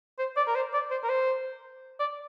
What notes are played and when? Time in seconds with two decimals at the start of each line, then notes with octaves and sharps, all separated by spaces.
0.19 C5
0.37 D5
0.47 A#4
0.55 C5
0.73 D5
0.91 C5
1.03 A#4
1.09 C5
1.99 D5